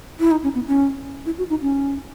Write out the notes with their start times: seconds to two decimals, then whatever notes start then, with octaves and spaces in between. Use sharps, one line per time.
0.20 E4
0.31 D#4
0.43 C#4
0.55 B3
0.67 C#4
1.26 E4
1.38 F#4
1.50 D#4
1.62 C#4